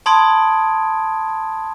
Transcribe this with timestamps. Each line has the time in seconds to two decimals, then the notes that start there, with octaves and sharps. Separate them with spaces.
0.06 A5 B5 C6 D#6 G#6 D7